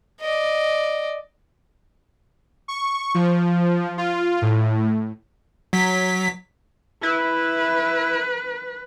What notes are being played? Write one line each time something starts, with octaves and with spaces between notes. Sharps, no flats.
D5 D#5
C#6
F3
F4
A2
F#3 B6
E4 B4